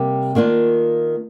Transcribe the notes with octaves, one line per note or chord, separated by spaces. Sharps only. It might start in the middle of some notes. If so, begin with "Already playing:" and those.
Already playing: C3 G3 A#3
D#3 A#3 D4 F4